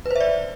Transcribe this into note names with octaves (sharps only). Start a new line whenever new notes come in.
B4 C5 D5 E5